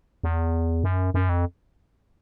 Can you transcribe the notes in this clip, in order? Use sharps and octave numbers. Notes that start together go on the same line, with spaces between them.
E2
F#2
F#2
F2